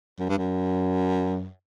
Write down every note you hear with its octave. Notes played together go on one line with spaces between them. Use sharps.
F#2
G2
F#2